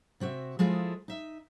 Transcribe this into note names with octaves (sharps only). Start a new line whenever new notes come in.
C3 C4 F#4 E5
F3 G#3 E4 F4 G#4 A4
D#4 E5